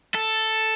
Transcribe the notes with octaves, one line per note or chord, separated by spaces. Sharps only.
A4